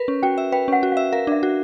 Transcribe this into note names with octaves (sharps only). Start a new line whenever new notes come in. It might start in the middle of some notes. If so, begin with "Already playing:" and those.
Already playing: A#4 B4
C#4
F#4 G5
E5
B4 G5
C#4 F#5
F#4
E5 F5
A#4 F5
D4 E5
F#4